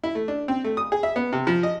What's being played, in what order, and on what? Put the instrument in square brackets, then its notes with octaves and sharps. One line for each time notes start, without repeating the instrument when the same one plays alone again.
[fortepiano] E4
A3
D4
C4
A3
D#6
G#4
E5
B3
C3
F3
D#5